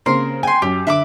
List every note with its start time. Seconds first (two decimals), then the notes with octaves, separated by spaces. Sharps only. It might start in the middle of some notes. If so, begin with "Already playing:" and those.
0.06 C#3 A#3 C4 A#4 C6
0.43 G5 G#5 C6
0.62 F#2 G4
0.87 D3 E5 B5 D6